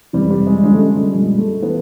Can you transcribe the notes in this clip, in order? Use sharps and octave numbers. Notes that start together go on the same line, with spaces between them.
F2 C3 E3 G3
G3
G#3
F#2 D3 F3 G#3
A3
G#3
G3
A#2 F3 G#3
A3
E3 B3